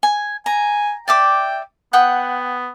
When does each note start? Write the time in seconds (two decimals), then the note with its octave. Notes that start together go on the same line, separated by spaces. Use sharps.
0.03 G#5
0.46 G#5 A#5
1.08 D5 E5 G5 D6
1.93 B3 F#5 G5 D#6